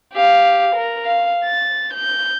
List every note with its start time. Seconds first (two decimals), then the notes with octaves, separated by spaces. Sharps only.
0.14 G4 F5
0.75 A#4
1.05 F5
1.44 A6
1.94 G6